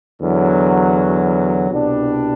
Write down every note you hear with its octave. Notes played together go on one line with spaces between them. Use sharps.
E2 D3 F#3
C2 B2 G3 D4